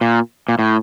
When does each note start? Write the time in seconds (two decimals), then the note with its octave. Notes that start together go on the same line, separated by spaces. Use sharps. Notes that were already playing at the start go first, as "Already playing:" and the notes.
0.01 A#2
0.49 A#2
0.59 A2